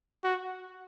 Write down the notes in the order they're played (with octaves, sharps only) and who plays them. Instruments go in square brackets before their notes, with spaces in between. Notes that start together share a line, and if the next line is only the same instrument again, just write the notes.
[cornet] F#4